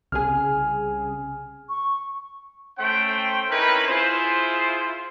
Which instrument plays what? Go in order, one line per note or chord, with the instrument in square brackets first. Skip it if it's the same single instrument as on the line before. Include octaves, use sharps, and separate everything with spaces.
[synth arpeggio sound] C2 C#3 G#4 [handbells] G#5 F6
[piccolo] C#6
[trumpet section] A3 C#4 C5 G5
C4 C#4 D#4 E4 A#4 B4
E4 F4 G#4 C5